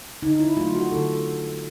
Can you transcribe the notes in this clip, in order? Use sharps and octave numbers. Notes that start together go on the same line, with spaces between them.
D3 D#4
E4
F#3 A3 F4
F#4
D3 A4